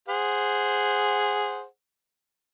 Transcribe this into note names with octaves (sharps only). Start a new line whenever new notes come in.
G#4 C5 F#5